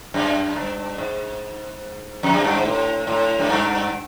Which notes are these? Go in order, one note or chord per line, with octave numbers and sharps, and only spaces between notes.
F#2
G2
G#2
F2
F#2
G2
G#2
A2
A2
F#2
G2